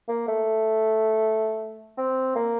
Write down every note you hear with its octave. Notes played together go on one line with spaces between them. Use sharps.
A#3
A3
C4
A#3